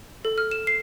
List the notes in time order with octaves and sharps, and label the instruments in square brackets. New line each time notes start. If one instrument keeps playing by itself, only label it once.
[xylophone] A4
F6
E7
C7